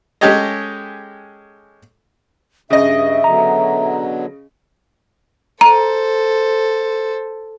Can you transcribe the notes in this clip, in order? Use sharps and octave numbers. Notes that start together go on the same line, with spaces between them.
G#3 C#4 G4 A4 C#5 D#5
G2 C#3 D#5 E5
B2 D3 F#3 A#5
A4 C5 A#5